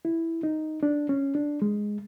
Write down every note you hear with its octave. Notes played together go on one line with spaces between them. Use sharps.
E4
D#4
D4
C#4
D4
G#3